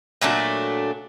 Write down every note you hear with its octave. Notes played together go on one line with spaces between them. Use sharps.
A#2 F#3 A3 D4